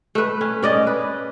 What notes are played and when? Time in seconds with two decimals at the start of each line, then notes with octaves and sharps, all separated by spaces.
0.15 A3 B4
0.41 C#4
0.63 C#4 D5 D#5
0.87 B4